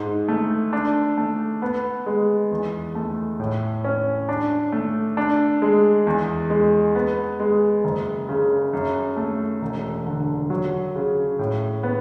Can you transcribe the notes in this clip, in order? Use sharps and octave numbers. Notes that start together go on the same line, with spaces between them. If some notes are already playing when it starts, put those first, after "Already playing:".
Already playing: G#2
A3
D4
A3
B3
G#3
E2
A3
A2
C#4
D4
A3
D4
G#3
E2
G#3
B3
G#3
F#1
C#3
F#2
A3
E1
D3
F#3
C#3
A2
B3